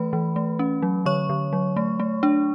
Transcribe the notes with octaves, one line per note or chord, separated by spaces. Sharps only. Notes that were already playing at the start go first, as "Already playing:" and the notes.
Already playing: E3 A3 B4 B5
E3
A3
C#4
F#3
D3 C#5 C#6
D3
F#3
A3
A3
D4